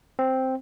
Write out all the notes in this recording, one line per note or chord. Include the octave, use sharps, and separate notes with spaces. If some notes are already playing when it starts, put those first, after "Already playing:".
C4